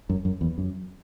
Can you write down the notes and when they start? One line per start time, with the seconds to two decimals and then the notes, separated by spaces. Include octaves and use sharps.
0.10 F#2
0.25 F#2
0.41 E2
0.58 F#2